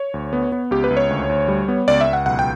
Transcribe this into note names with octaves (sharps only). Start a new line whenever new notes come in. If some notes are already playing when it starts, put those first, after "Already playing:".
Already playing: C#5
D2
B3
B3
C#2 G4
B4
C#2
C#5
D2
D2
G3
B3
C#2 D5
E5
C#2
F#5
B1 F#5
G5